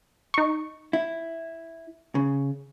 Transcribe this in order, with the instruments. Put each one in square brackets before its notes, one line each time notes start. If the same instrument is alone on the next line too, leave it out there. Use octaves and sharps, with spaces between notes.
[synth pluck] D#4 C#6
[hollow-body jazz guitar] E4
C#3